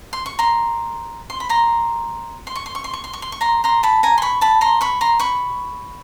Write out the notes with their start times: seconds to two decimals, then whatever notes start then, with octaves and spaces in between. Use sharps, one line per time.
0.13 C6
0.26 C#6
0.39 A#5 C6
1.30 C6
1.40 B5
1.49 A#5 C6
2.47 C6
2.55 C#6
2.66 C6
2.75 C#6
2.84 C6
2.93 C#6
3.04 C6
3.13 C#6
3.22 C6
3.32 C#6
3.41 A#5 C6
3.64 A#5 C6
3.83 A5 B5
4.03 G#5 A#5
4.18 C6
4.22 B5 C#6
4.41 A5 B5
4.61 A#5 C6
4.81 B5 C#6
5.01 A#5 C6
5.20 B5 C#6